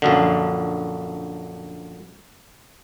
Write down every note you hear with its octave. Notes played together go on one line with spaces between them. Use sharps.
A#1 F#2 D3